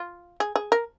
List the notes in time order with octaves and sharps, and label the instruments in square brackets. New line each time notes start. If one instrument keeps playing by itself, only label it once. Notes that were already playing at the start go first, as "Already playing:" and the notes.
Already playing: [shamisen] F4
G#4
G#4
A#4